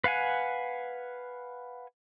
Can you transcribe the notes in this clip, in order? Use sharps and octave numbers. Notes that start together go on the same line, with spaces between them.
B4 F5 F#5 G#5